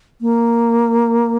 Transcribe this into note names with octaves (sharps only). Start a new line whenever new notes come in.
A#3